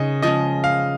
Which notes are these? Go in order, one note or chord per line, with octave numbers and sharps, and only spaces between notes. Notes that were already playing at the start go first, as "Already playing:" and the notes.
Already playing: C#3 D#4 D#5
F3 G#3 C#4 D#5
F5